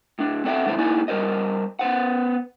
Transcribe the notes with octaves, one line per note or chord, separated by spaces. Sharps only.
A2 D4
C4 A4 D5 E5 F#5 G5
D3 E3 A3 E4 C5
A#3 D#4 E4 D5 G#5
G3 A#4 C5 D#5
B3 C5 F#5